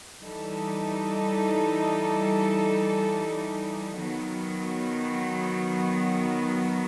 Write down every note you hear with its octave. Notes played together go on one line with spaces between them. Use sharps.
E3 G3 D#4 A4
D#3 F#3 B3